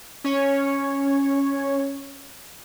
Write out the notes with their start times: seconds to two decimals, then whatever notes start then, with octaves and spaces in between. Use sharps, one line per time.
0.24 C#4 C#5